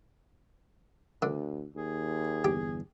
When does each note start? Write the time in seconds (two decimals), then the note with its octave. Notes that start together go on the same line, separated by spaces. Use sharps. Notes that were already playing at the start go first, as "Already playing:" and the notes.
1.22 D2 D3
1.76 D#2 G#4
2.44 G1 E2 G4